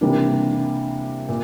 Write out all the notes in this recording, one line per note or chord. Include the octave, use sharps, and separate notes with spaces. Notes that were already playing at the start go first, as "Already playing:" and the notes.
C3 E3 G3 A#3 D4
A#2